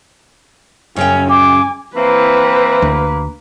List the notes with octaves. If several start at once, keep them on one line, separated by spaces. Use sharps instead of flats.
F#2 C#3 C#4 G5
G#5 D6
E3 A#3 C4 B4
D2